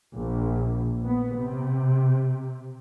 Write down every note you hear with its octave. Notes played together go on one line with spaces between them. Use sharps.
A#1
B3
C3